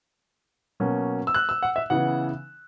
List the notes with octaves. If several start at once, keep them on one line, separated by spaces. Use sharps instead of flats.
B2 F#3 A#3 C#4
E6
F#6
E6
F#5
E5
C#3 E3 B3 F#5